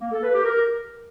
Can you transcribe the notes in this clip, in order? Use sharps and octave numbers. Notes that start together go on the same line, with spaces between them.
A#3
A4
B4
G4
A#4